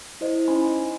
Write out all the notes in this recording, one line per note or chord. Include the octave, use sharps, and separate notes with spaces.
E4 C5 D#5
C#4 D#4 C5 G#5 B5 C6